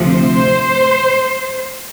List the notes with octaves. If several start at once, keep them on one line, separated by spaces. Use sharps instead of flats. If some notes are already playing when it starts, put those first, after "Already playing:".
Already playing: D2 C3 F3
C5